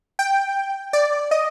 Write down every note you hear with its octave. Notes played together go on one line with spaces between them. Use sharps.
G5
D5
D#5